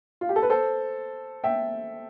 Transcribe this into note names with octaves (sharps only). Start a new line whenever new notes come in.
F4
G4
A4
B4
A4 C5
E5 G5